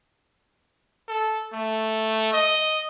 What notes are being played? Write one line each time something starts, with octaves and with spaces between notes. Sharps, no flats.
A4
A3
D#5